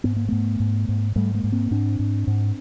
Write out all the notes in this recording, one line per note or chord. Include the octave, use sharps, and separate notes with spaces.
G#2 B3
A#3
G#2 A3 B3
G#2
G#2
G#2 G3 A3
G#3 A#3
G#2
A#3 C4
G#2 C4 D4
G#2
G#2